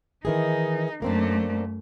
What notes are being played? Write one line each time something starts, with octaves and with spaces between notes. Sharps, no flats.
D#3 E3 D#4 G#4
F#2 A3 A#3 C4 D4